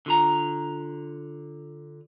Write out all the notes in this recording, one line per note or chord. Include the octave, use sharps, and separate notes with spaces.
D3 F4 A#5